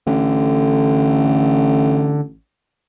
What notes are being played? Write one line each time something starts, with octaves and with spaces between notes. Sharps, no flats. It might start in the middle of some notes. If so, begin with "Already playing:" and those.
A1 D3